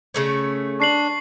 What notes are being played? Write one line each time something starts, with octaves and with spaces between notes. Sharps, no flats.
C#3 A3 C#4
D4 C#6 C7 F#7